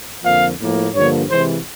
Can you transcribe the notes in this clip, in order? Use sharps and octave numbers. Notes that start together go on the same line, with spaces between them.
F2 D3 F3 A#3 F5
A2 F3 A#3
G2 D3 F3 A#3 C#5
C3 E3 G#3 C5